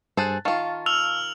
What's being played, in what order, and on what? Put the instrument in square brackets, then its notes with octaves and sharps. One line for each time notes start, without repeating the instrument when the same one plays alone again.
[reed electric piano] G2 A5 F#6 [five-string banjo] G#4 A4 C5
[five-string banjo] D#3 F4 [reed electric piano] F5 A5 C#6
[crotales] E6 F6 F7